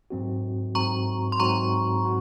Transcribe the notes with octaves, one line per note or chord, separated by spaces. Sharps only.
G#2 F#3 C4 F#4
G#2 F#3 C4 F#4 A#5 C#6
C6
G#2 F#3 C4 F#4 A#5 C#6
F#4